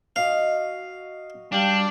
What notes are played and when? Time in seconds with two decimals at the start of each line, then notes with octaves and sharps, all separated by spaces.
0.16 F#4 D#5 F5
1.52 G3 D4 F5 G5